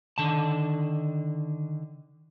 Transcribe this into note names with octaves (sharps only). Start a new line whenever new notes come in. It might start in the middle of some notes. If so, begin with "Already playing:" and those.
D3 D#3 A5